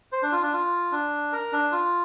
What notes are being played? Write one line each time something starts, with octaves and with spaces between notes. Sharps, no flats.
C5
D4
F4
D4
F4
D4
A#4
D4
F4